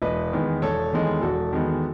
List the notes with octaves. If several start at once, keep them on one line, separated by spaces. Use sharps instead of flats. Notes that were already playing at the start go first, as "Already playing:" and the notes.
E1 B4 D#5
E2 D#3 G#3 B3
E1 A4 C#5
E2 D#3 G#3 B3
E1 F#4 A4
E2 D#3 G#3 B3